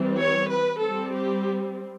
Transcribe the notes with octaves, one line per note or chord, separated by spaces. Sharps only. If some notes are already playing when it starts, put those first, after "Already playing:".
Already playing: E3 G3 C4
C#5
B4
G3 C4 A4
G4